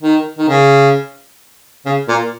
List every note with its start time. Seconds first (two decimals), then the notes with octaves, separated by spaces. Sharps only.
0.02 D#3
0.38 D#3
0.48 C#3
1.86 C#3
2.09 A#2